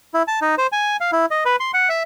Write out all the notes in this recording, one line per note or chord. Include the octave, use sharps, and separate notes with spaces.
E4
A5
D#4
C5
G#5
F5
E4
D#5
B4
C6
F#5
E5